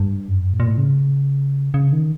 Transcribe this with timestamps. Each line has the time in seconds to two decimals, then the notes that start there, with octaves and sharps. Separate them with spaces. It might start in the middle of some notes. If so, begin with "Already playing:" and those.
Already playing: G2
0.28 F#2
0.53 A2
0.60 A#2
0.67 A2
0.78 C#3
1.74 C#3
1.92 D#3